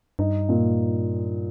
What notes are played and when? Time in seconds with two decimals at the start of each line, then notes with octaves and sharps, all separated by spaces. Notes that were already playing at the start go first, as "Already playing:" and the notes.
0.19 G2 D#4
0.49 A#2